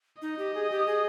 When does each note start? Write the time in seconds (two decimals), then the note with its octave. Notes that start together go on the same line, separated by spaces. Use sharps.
0.22 D#4 D#5
0.39 G4
0.55 G#4
0.71 G4
0.87 G#4